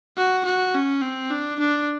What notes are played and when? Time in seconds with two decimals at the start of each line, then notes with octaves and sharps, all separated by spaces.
0.17 F#4
0.45 F#4
0.74 C#4
1.02 C4
1.30 D4
1.59 D4